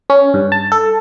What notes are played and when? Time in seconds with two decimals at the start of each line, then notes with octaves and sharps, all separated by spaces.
0.10 C#4
0.34 G2
0.52 A5
0.72 A4